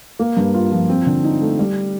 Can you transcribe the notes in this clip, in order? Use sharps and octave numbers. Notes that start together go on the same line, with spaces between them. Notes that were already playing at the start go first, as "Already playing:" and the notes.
A#3
G2
F4
F3
C4
D3
D#4
A3
G3